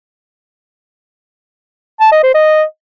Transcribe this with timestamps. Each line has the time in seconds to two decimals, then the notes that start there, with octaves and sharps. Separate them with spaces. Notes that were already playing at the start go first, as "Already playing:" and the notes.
2.00 A5
2.12 D#5
2.23 C5
2.34 D#5